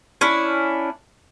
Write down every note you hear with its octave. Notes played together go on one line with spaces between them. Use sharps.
C#4 D4 E4